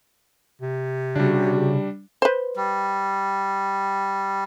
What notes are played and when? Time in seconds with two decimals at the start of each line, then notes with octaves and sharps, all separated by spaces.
0.62 C3
1.16 C#3 G3 D4 F#4
2.22 B4 C5
2.56 G3